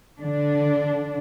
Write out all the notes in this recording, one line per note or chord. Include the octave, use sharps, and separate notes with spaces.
D3 D4